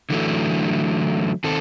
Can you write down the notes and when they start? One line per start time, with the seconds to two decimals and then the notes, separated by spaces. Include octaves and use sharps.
0.10 D3 E3 F#3 A3
1.44 D#3 C4 A4